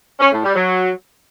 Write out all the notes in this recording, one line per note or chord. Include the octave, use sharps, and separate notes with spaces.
C#4
A2
G3
F#3